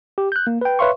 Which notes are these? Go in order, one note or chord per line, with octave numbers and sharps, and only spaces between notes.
G4
F#6 G6
A#3
B4 G5
B4 C#5 E5 F5 C6 C#6